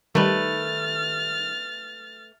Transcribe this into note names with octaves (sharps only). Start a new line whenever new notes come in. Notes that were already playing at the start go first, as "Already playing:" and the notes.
D#3 G3 A3 B4 F6 A6